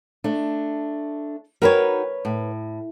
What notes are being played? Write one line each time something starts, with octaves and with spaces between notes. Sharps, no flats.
A3 D4
D#4 F#4 A#4 B4 C#5 G5
A2